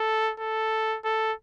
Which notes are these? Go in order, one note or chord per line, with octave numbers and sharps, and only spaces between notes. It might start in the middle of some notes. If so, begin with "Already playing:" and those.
Already playing: A4
A4
A4